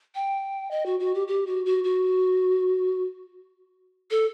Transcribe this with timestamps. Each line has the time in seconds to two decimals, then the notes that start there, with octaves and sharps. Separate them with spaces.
0.15 G5
0.71 D#5
0.86 F#4
1.00 F#4
1.14 G4
1.28 G4
1.47 F#4
1.66 F#4
1.84 F#4
4.11 A4